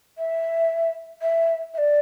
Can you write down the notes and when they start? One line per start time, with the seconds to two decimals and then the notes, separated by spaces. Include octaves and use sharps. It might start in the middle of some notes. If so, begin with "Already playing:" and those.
0.17 E5
1.21 E5
1.74 E5
1.78 D5